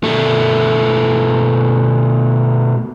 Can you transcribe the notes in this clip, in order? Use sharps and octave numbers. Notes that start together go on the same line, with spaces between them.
B2 A3